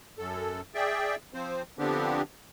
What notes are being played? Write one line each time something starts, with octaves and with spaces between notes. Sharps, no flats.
F#2 A4
G#4 D5 E5 G5
F3 C4 C5
D3 F3 B3 C4 D4 G4